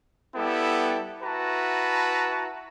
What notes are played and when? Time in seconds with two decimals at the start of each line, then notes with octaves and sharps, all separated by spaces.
0.36 G3 B3 E4 G4 A4
1.23 E4 F#4 B4 A5 A#5